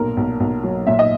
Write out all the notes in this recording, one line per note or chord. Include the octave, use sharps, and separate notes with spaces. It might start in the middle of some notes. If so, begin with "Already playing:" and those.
Already playing: B1 A#2 A#4
B1
B1
F#3
A#2 E5
D#5